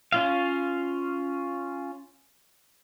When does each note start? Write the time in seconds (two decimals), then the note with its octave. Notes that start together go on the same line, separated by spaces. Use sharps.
0.12 C#4 F4 F5